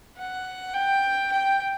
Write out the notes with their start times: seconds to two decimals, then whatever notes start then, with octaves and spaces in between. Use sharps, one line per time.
0.18 F#5
0.74 G5
1.32 G5